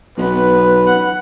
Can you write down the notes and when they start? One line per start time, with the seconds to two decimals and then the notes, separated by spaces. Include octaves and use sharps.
0.18 B1 B3 B4
0.87 F#5